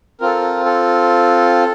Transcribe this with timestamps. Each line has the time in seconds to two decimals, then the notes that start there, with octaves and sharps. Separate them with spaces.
0.20 C4 F4 A4 A#4
0.65 A4